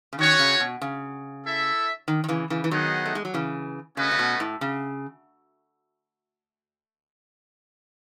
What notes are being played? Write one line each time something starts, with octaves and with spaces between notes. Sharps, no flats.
C#3
D#3 C#4 F#4 C#5 F#5
C#3
B2
C#3
E4 A4 E5
D#3
D#3
C#3 E3
C#3 E3
E3
D#3 F#3 B3 D#4 G#4 D#5 F#5
A3
G#3
F#3
C#3 E3
C#3 A3 C#4 F#4 B4 D#5
C#3
B2
A2
C#3